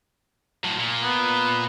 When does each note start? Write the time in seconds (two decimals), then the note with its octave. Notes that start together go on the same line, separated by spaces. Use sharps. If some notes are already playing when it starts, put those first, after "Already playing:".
0.64 A2 F#3
0.79 A#2
1.03 B3